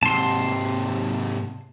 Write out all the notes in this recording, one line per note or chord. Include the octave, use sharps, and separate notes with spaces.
G#2 C3 A5 C6